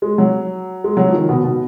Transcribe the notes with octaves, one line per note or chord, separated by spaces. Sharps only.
G#3
F#3
G#3
F#3
F3
D#3
B2
B2